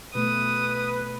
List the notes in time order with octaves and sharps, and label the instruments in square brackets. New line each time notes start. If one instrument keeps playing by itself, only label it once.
[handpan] B2 A3 [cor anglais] B4 [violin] D#6